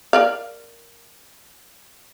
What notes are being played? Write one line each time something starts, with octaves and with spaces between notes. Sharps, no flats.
A#4 D5 F5